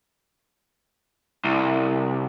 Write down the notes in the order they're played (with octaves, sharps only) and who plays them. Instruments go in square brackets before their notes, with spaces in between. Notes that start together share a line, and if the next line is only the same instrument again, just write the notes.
[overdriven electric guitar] C2